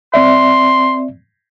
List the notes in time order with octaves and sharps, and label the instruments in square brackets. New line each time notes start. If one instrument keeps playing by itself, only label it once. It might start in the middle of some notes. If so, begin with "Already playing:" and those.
[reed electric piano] C4 D5 E5 [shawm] C6